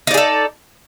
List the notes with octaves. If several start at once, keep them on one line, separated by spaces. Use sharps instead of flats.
D#4 G#4 A4 D5